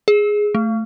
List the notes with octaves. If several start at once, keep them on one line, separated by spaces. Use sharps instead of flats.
G#4
A3